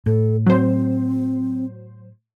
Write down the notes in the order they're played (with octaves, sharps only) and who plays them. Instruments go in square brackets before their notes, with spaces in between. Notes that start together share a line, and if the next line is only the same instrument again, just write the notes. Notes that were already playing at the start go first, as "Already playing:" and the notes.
[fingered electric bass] A2 [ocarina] A4
[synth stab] F#3 C5 [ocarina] C4